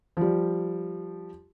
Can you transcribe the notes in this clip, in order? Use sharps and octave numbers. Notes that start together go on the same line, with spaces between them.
F3 G3